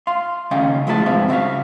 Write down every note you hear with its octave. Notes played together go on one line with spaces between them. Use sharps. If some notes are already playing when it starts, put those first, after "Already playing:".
F5 C6
D#2 C#3 C#4 D#5 F5 G5
F3 G#3 A3 E4 C#5 A5
B1 G2 G#3 C4 E5 F5
C#2 E4 F#4 E5 F5